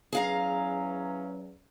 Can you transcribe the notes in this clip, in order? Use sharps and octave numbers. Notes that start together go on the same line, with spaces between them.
E2 F#3 C#4 G#4 F5 A#5